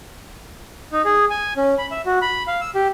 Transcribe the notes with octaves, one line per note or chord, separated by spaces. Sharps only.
D#4
G#4
G#5
C#4
B5
E5
F#4
B5
F5
E6
G4